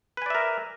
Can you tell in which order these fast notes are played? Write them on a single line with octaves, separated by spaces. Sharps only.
B4 G#5 D5 E5 A#4